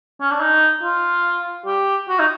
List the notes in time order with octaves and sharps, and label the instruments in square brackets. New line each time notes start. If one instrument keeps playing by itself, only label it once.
[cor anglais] C#4
D4
D#4
F4
G4
F#4
D#4